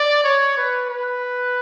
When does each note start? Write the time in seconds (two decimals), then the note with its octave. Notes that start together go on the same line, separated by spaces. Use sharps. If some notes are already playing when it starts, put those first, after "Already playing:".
Already playing: D5
0.24 C#5
0.57 B4
0.90 B4